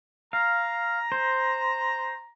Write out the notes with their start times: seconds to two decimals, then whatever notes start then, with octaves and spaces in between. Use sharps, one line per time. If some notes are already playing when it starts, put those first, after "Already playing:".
0.33 F5 A#5
1.12 C5